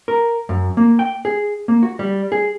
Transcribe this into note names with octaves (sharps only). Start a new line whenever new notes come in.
A#4
F#2
A#3
G5
G#4
A#3
F#4
G3
G#4